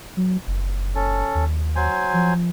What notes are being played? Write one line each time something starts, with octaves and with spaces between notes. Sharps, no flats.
F#3
F#1
C#4 A4
D#2
F#3 C5 G#5
F3